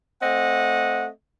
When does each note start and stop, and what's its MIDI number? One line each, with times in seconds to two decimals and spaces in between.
0.23 1.07 57
0.23 1.07 60
0.23 1.07 75
0.23 1.07 78